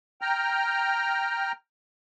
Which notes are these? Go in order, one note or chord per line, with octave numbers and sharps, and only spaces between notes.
G5 A#5 F6